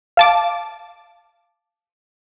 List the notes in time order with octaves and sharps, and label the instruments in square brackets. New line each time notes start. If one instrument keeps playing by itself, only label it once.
[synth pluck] F5 A5 D6